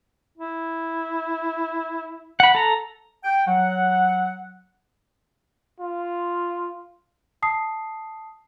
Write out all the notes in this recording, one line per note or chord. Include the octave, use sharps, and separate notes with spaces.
E4
F#5 B5
A4 A#5
G5
F#3 F#5
F4
A5 D#6 C7